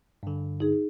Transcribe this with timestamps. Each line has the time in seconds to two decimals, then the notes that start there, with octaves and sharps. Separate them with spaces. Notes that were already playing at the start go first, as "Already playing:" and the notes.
0.23 G2 D3
0.60 D#4 G#4